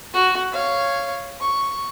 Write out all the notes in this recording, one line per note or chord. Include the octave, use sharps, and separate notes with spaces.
F#4
C#5 F5
C#6